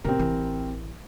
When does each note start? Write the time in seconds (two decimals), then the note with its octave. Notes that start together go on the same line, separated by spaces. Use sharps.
0.04 A2 C#3 C4 G4 A#4
0.19 A1 E3